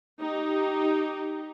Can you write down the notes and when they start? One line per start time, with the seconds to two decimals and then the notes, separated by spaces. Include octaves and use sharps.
0.21 D#4 G4